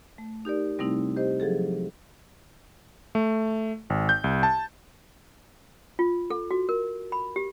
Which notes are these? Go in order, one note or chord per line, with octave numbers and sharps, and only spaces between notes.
A3
D#4 G4 A#4 D5
C3 G3 A3 C4 D#4 E4
G4 C5 D#5
F3 F#3 G#4 A4
A3
G#1
G6
C2
A5
F4
A4
F#4
A#4
B5
G4